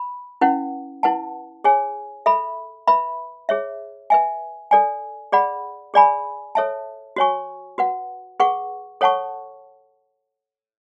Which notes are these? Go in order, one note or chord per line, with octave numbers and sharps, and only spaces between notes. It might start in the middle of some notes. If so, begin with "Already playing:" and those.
Already playing: B5
C#4 E4 B4 F#5
E4 B4 F#5 A5
G#4 C#5 G#5
A4 E5 B5
B4 E5 B5
G#4 C#5 E5
B4 E5 G#5
A4 D5 G#5
G#4 D5 F#5 B5
G#4 D5 G#5 B5
A4 C#5 E5 A5
F#4 C#5 G#5 C#6
F#4 B4 F#5
G#4 B4 F#5 C#6
A4 C#5 F#5 A5 C#6